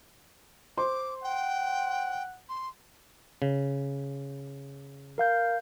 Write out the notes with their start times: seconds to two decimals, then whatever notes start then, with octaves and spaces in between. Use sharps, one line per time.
0.78 C5 C6 D6
1.24 F#5 G5
2.49 C6
3.42 C#3
5.18 A#4 F5 G6